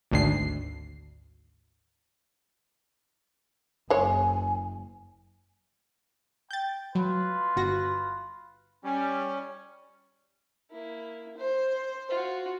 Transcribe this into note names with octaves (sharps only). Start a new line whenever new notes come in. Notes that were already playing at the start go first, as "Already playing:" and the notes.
G#1 D2 C7
F#1 G#3 C#5 G#5
G5 G6 A6
F#3 F4 B4 C6
G1 F#4 A#6
G3 C#4
A#3 E4
C5
F4 F#4